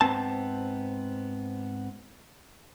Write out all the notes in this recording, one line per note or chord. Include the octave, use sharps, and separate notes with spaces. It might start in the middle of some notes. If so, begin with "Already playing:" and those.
G#2 F3 B3 C4 A5